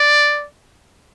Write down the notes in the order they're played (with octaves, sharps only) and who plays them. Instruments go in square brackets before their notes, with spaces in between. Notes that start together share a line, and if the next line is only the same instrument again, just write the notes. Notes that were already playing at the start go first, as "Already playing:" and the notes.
Already playing: [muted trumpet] D5